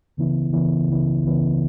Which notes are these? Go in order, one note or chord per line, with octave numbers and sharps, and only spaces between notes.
C#2 C#3 E3 B3 E4
C#2 C#3 E3 B3 E4
C#2 C#3 E3 B3 E4
C#2 C#3 E3 B3 E4